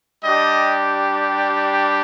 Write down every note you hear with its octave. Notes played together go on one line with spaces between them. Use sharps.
G3 D4 G4 D#5